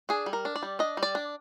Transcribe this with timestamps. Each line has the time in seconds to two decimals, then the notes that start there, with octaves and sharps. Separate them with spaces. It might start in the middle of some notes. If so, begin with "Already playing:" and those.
0.09 D4 G#4
0.26 G3
0.33 A#4
0.45 D4
0.56 D5
0.63 G3
0.79 D4 D#5
0.97 G3
1.03 D5
1.15 D4